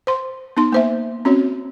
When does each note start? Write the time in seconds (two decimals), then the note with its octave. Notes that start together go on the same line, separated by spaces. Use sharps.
0.07 C5 C6
0.57 B3 D#4 C6
0.72 A#3 C5 E5
1.25 C4 C#4 F#4 C#5